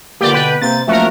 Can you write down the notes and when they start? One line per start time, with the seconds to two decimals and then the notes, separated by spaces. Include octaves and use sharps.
0.21 D3 A#3 B3 F4 G4 D5
0.34 B2 B4 G5
0.62 C3 A#3 C5 A6
0.88 F#2 F3 A3 A#3 F#4 A#4